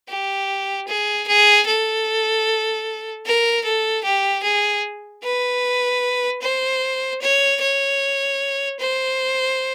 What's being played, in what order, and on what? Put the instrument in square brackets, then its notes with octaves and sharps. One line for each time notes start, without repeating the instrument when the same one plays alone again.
[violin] G4
G#4
G#4
A4
A#4
A4
G4
G#4
B4
C5
C#5
C#5
C5